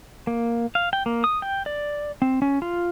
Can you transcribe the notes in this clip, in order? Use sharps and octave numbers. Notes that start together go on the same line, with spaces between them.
A#3
F5
G5
A#3
D#6
G5
D5
C4
C#4
F4